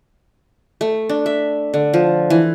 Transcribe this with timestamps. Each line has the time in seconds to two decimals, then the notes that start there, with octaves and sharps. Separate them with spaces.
0.81 A3
1.09 D4
1.26 E5
1.74 D3
1.94 F3
2.30 E3